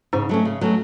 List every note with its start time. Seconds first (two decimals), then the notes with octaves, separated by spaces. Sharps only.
0.13 G#2 C#3
0.29 F#3 A3 C#4
0.45 C#3
0.61 F#3 A3 C#4